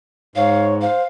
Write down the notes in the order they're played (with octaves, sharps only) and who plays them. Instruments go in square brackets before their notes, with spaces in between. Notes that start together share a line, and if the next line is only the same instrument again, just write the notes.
[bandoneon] G#2 [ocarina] C#5 [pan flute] F5
[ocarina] C5 [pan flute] F5